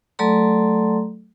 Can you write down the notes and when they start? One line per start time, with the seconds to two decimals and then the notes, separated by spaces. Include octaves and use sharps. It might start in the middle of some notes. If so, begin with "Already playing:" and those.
0.19 F#3 A3 A4 D5 A#5 C6